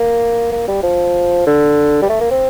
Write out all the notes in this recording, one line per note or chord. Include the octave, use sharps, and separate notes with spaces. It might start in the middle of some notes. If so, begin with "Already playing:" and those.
Already playing: A#3
A#3
G3
F3
D3
G3
A3
A#3
C4